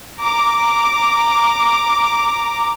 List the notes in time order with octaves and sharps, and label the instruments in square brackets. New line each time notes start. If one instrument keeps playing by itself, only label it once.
[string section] A#5 D6